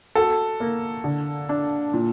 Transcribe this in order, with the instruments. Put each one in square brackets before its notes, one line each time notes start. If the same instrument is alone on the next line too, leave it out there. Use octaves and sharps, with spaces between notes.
[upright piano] F#4 [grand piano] A4
[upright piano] A#3
D3
D4
A#2